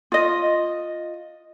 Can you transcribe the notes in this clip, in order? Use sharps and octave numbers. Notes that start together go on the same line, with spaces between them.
F4 D#5